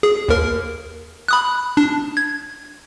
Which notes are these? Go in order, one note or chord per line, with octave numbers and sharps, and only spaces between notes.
G#4
D#2 A#4
B5 D#6 F#6
D4
G#6